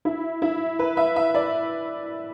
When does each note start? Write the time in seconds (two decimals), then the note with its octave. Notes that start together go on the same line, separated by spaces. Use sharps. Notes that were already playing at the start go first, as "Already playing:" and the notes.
0.05 E4
0.42 E4
0.79 B4
0.97 E5
1.16 E5
1.35 D5